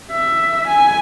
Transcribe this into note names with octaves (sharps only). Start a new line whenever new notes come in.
E5
G#5